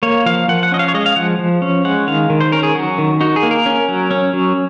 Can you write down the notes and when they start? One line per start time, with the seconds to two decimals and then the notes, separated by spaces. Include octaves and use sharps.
0.03 A#3 C#5
0.26 F3 F5
0.48 F3 F#5
0.63 F#5
0.72 C#4 D#5
0.79 F5
0.88 C#5
0.94 G#3 D#5
1.06 F5
1.16 F3 F#5
1.39 F3
1.62 C#4
1.85 G#3 F#5
2.07 D#3 F5
2.30 D#3
2.41 C5
2.52 C#4 A#4
2.63 G#4
2.75 F#3 F#4
2.98 D#3
3.21 D#4 F#4
3.36 G#4
3.43 A#3
3.51 A#4
3.66 C#4
3.88 F#3
4.11 C#4
4.33 F#3